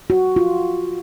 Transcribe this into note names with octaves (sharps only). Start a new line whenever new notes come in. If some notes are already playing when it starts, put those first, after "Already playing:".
F#4
F4